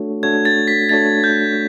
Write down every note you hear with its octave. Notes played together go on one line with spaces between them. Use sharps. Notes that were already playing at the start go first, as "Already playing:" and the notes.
Already playing: A3 D4 F#4 A4 C#5
A3 D4 F#4 A4 C#5 G#6
A6
B6
A3 D4 F#4 A4 C#5 A6
G6